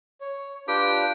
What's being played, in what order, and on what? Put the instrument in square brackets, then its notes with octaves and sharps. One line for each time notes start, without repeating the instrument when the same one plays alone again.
[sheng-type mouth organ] C#5
[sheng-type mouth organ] D4 F4 B4 [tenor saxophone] G4